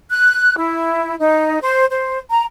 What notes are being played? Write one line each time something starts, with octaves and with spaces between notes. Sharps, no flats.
F#6
E4
D#4
C5
C5
A#5